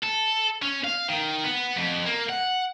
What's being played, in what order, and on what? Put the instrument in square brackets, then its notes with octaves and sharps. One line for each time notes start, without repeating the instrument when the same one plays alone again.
[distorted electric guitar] A4
C#4
F5
D#3
B3
F2
A#3
F#5